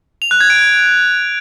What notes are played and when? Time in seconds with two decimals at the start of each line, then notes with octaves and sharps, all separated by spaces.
0.22 F7
0.31 F#6
0.40 G#6
0.50 D7
0.59 G#6